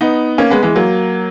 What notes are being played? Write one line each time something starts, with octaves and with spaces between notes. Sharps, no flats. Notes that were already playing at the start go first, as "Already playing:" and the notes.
B3 D#4
A#3 C#4
G#3 B3
E3 G#3
F#3 A#3